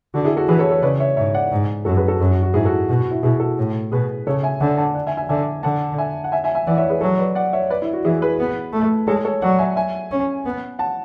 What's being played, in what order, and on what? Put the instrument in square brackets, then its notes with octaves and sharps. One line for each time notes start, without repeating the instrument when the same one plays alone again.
[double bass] D3 [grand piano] F#4
[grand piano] E4 G#4
F#4 A4
[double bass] E3 [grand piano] G#4 B4
[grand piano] A4 C#5
A4 C#5
[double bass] C#3 [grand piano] B4 D5
[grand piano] C#5 E5
[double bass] G#2 [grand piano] C#5 E5
[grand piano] D5 F#5
[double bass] G#2
[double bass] F#2 [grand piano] F#4 A4
[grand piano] G#4 B4
F#4 A4
[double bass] F#2
[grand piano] F#4
F#4
[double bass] G#2 [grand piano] E4 G#4
[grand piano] F#4 A4
[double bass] B2 [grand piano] F#4
[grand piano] F#4
E4
[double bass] B2 [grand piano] E4 G#4
[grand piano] F#4 A4
[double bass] A2
[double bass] B2 [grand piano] G#4 B4
[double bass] C#3 [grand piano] A4 C#5
[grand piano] E5 G#5
[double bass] D3 [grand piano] D5 F#5
[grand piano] F#5 A5
D5 F#5
E5 G#5
E5 G#5
[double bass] D3 [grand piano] E5 G#5
[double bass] D3 [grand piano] F#5 A5
[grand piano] E5 G#5
F#5
E5 G#5
E5 G#5
E5 G#5
[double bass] E3 [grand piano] D5 F#5
[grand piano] C#5 E5
G#4 B4
[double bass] F#3 [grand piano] A4 C#5
[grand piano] B4 D5
D5 F#5
C#5 E5
B4 D5
E4
F#4
[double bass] E3 [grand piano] E4 G#4
[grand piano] G#4 B4
[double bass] B3
A3
[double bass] G#3 [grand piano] A4 C#5
[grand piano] A4 C#5
[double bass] F#3 [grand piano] D5 F#5
[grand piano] E5 G#5
E5 G#5
[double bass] C#4
B3
[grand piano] F#5 A5